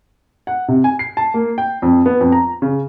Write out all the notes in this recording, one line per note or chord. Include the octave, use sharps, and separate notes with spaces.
F#5
C3
G#5
C7
A5
A#3
G5
F2
B3
F2
A#5
C#3